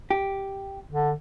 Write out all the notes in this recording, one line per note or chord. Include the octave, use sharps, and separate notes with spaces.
G4
D3